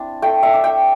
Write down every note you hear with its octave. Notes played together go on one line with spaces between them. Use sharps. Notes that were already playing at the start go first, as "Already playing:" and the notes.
Already playing: C4 D4 E4
A3 G5
E5
D4
G5